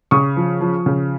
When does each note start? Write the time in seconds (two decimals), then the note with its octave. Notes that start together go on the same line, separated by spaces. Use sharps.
0.11 C#3 C#6 D#6
0.36 F3
0.61 F3
0.86 C#3